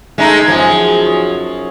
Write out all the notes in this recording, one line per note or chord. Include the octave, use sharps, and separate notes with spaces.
G#3 A3 D#4
F#2 F3 G#4
C#5